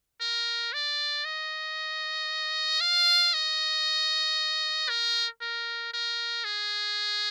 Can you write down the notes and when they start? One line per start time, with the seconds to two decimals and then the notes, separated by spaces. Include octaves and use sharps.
0.21 A#4
0.73 D5
1.25 D#5
2.81 F5
3.34 D#5
4.89 A#4
5.41 A#4
5.93 A#4
6.45 G#4